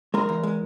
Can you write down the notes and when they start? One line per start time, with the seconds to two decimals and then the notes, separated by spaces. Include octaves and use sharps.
0.14 G#3 A#4
0.29 E2
0.43 G#3